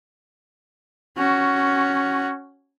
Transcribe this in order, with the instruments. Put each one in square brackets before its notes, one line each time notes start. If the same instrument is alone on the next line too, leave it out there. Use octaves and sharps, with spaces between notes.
[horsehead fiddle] C#4 F#4